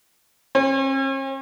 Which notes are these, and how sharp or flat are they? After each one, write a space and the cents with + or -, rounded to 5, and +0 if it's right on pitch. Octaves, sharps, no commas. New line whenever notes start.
C#4 -45